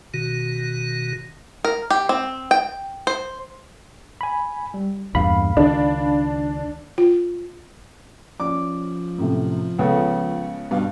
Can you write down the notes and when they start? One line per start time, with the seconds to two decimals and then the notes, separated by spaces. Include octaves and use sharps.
0.14 B2 D#3 F#4
1.65 A#4
1.90 G4
2.09 C4
2.51 G5
3.07 C5
4.21 G#5 B5
4.74 G3
5.15 E2 G2 A#2 F5 B5
5.57 C#2 D#3 D4
6.98 F4
8.40 F3 C#4 D5 D6
9.18 F#2 A2 C3
9.78 C#2 C#3 B3 A4
10.71 G2 B2 F5